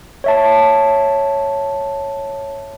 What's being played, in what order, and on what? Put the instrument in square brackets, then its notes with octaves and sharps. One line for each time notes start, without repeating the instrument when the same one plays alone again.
[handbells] C#5 E5 A5